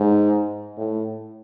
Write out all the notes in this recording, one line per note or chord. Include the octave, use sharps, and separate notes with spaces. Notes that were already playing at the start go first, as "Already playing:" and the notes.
Already playing: G#2
A2